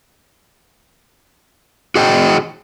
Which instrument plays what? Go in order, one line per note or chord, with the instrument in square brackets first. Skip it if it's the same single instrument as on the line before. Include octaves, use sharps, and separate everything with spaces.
[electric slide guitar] F#4 G#4 D#5 G5